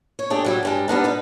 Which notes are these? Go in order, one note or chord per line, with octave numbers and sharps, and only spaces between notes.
C#5
A3 D4 G4 G#4
F#3 G3 E4
G2 G3 G#3
G3 B3 D4 D#4
B3 D#4 B4